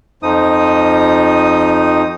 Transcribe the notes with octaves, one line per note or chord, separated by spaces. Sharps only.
F2 F3 D#4 D#6